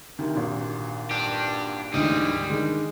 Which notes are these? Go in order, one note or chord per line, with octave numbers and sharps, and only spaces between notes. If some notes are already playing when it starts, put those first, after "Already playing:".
D2 C3 D#3
G#1 G2 A#2
D4 G4
D2 G#2 E3 G3 D#5
D3 D#3 G#3